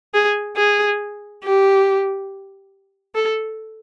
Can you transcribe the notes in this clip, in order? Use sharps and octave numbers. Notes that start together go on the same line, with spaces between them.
G#4
G#4
G4
A4